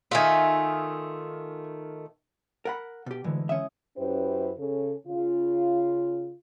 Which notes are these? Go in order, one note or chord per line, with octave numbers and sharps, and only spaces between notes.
D#3 A3 F4 E5 G#5
A#4 F#5 B5
B2 G4
D2 D3 E3 G#3
C#4 E5 D#6
F#2 C#4 E4 G4 B4 C5
C#3 C#4 A4
C#3 F4